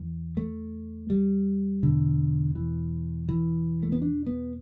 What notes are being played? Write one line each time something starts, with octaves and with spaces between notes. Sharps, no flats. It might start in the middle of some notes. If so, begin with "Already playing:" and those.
Already playing: E2 E3
A3
G3
E2 B2 D3
E3
E3
A3
B3
D4
B3